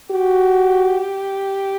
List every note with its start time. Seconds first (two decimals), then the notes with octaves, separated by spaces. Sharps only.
0.11 F#4 G4